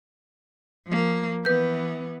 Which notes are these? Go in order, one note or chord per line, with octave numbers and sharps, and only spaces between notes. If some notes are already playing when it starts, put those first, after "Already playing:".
F3 A#3
E3 B3 B4 G6